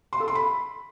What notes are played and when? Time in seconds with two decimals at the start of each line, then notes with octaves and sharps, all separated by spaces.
0.13 C6
0.20 A4
0.28 C6
0.35 B5